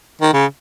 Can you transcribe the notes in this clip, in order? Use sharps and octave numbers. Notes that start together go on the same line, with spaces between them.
D#3
C#3